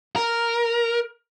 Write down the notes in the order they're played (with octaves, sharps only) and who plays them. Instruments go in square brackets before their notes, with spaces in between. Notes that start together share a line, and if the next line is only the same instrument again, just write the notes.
[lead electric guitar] A#4